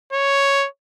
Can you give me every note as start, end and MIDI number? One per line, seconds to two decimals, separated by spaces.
0.13 0.67 73